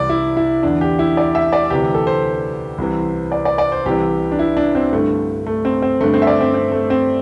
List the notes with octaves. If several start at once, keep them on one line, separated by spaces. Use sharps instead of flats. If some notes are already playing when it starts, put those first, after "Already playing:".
Already playing: C2 C3 E3 D5
E4
E4
E2 D3 D4
G4
E4
D5
E5
D5
D2 C3 E3 G4
A4
C5
C2 C3 E3
D5
D5
D5
C5
C2 C3 E3 G4
D4
E4
D4
C4
G2 D3 A3
A3
C4
C4
G2 D3 A3
C4
E5
D5
C4
C4
A3
C4